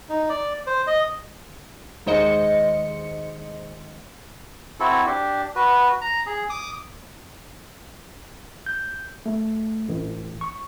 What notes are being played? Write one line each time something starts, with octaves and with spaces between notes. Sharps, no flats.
D#4
D5
C5
D#5
D#2 D#3 G#3 C5 D#5 C#7
C4 E4 F#4 A4
D4 G4
F#4 B4
A#5
G#4
D6 D#6
G6
A3
A1
C#6